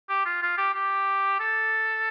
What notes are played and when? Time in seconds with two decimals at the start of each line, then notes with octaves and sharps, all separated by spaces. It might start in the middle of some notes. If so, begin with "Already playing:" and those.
0.09 G4
0.25 F4
0.42 F4
0.57 G4
0.74 G4
1.40 A4